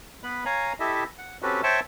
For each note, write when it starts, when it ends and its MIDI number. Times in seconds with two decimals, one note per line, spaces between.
0.24 0.44 59
0.24 0.44 71
0.24 0.44 83
0.45 0.73 73
0.45 0.73 77
0.45 0.73 80
0.45 0.73 82
0.80 1.04 64
0.80 1.04 67
0.80 1.04 69
0.80 1.04 75
0.80 1.04 76
1.18 1.37 78
1.42 1.61 60
1.42 1.61 61
1.42 1.61 66
1.42 1.61 67
1.42 1.61 69
1.42 1.61 71
1.63 1.80 72
1.63 1.80 73
1.63 1.80 76
1.63 1.80 79
1.63 1.80 81
1.63 1.80 85